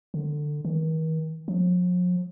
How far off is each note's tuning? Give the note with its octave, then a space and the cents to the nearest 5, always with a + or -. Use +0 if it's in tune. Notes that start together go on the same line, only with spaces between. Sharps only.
D3 +15
D#3 +45
F3 +45